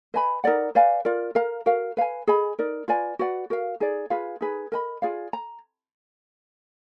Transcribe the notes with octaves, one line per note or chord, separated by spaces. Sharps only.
B4 D#5 G#5 B5
D#4 A#4 D5 F#5
B4 D5 F5 G#5
F4 A#4 D5
A#4 F5 A#5
F#4 A#4 F5
B4 F5 G#5
G#4 D#5 G#5 B5
D#4 A#4 D5
F4 B4 D5 G#5
F#4 B4 D5 F#5
F#4 A#4 F5
D#4 G#4 D5
F4 G#4 B4 F5
D#4 G#4 B4
A#4 D#5 G#5 B5
F4 G#4 D5 F5
A#5